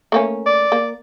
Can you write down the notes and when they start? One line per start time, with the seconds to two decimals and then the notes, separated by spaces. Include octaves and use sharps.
0.12 A3 A#3 C#4
0.46 D5
0.72 A#3